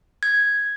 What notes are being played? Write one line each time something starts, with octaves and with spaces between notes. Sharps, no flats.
G#6